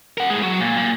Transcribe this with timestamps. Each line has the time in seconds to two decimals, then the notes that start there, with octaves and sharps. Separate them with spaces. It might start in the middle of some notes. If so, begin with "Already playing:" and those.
0.18 A#4 F#5
0.30 A2 G#3
0.43 F#3
0.60 A#2
0.77 A#2